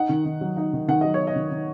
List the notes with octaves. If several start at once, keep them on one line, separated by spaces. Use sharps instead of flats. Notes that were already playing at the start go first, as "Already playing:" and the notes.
Already playing: D#4 F#5
D#3
D#3
F#3
D#4
D#3
D#3 F#5
F#3 D#5
C#5
D#4
D#5
D#3
D#3